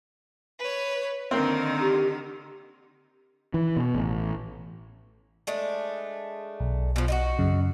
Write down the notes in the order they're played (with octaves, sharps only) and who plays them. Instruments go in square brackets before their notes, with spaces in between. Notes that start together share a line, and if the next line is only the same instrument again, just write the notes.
[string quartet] B4 C#5
[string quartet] D3 D#3 D#4 [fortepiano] A#3 C4
[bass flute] G4
[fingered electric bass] E3
B2
A1
[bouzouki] G#3 A3 D4
[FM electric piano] B1
[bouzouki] B2 F3
D#4 F4 F#4
[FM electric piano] F#2 C#3